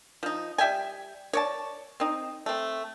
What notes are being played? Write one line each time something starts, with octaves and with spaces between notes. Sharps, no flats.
F3 D#4
G3 E5 G5 G#5
C#5 D5 A5
C4 D#4
A3 C4